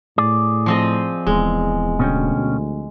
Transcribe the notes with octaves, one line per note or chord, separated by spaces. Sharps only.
A2 G#4 D5
F3 C4 D#5
D1 E2 G#3
D2 B2 C#4 G5